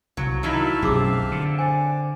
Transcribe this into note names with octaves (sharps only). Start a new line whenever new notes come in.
C2 F#3
D#3 F#3 D#4 E4 E5 F5 A5
B1 F#2 B2 C4 G4 G#4 D6
D3
C5 D5 G#5